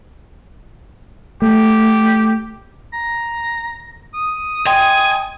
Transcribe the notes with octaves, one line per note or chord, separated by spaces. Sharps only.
A3 G4
A#5
D#6
D#5 G5 G#5 C6